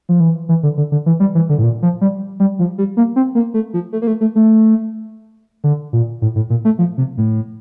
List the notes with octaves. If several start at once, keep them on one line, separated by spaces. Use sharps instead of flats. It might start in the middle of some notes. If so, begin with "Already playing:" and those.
F3
E3
E3
D3
D3
D3
E3
G3
E3
D3
A2
A#2
F3
G3
G3
F3
G3
A#3
C4
A#3
A3
F3
A3
A#3
A3
A3
A3
D3
A#2
A2
A2
A#2
A3
F3
C3
A2